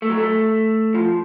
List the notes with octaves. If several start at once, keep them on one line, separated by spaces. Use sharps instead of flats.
A3
F#3
A3
F3